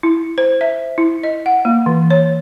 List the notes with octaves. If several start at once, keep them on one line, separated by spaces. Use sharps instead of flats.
E4
C5
E5
E4
D#5
F#5
A#3
E3
C#5